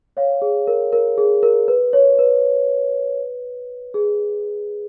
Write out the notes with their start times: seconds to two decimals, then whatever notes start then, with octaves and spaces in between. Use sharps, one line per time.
0.17 C#5 F5
0.42 G#4
0.67 A#4
0.93 A#4
1.18 G#4
1.43 A#4
1.68 B4
1.93 C#5
2.19 B4
3.94 G#4